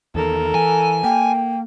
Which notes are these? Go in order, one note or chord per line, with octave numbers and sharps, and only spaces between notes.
E2 D#3 A4 A#4
E3 G#5
A#3 G5